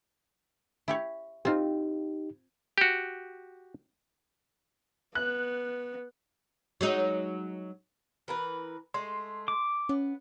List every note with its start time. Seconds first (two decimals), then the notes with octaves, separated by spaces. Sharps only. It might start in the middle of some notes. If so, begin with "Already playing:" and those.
0.88 E4 G4 C#5
1.45 C4 D#4 F4 G4
2.78 F#4 G4
5.15 B3 F#6
6.81 F#3 G#3 D#4
8.28 E3 A#4 B4
8.94 G#3 A3 C6
9.48 D6
9.89 B3 C#4